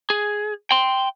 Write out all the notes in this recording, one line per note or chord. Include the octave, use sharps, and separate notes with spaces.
G#4
G5 C6